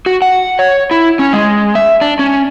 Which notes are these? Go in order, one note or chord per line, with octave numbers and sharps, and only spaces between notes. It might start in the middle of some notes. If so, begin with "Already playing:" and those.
F#4
F#5
C#5
E4
C#4
G#3
E5
D4
C#4